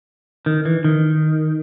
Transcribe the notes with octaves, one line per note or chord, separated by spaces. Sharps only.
D#3
E3
D#3